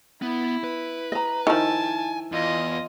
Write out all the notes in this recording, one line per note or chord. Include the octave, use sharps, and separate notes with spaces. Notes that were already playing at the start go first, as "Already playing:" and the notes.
B3 E4
B4
D#5 A#5
D#3 F3 E4 G#5 A5
E2 F4 D#5